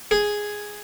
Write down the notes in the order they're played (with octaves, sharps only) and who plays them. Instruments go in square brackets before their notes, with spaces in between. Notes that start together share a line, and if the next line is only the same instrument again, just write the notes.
[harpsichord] G#4